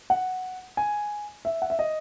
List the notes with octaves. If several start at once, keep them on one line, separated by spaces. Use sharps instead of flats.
F#5
G#5
E5
F#5
E5
D#5